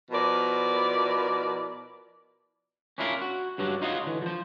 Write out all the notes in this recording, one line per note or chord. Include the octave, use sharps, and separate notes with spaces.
B2 F3 E4 A#4 D5
C#4 D4 E4 F4 G4 A#4
F#4
G2 F#3 D4 F#4
D#4 F4 F#4 C#5 D#5
D3 E3
F3 C5